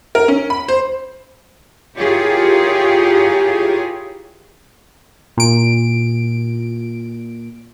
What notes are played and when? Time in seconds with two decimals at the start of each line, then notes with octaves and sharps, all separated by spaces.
0.15 A#4
0.28 C#4
0.50 B5
0.68 C5
1.96 E4 F4 G4 G#4 A#4 C#5
5.37 A#2 D7